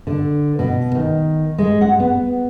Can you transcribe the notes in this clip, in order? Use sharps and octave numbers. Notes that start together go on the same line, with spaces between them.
D3
B2
D#3
G#3
F#5
B3